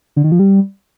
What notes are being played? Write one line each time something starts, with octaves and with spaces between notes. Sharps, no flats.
D3
D#3
F3
G3